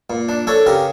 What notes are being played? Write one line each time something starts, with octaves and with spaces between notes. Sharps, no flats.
A#2
D4
D4 A4 C#5
C#3 G4 A#4